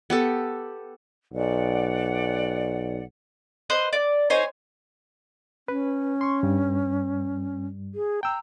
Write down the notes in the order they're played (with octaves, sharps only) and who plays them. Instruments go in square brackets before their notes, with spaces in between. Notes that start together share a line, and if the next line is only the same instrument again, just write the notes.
[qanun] B3 G4 A4
[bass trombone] B1 [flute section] D5 F#5
[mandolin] B4 C5 D#5 F#5
D5
D#4 C5 C#5 G#5
[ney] C#4 [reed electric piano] B4
[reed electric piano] C6 C#6
G2 G3
[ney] G#4
[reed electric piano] G5 E6 [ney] A#5